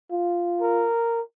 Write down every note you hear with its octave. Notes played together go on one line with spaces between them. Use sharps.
F4
A#4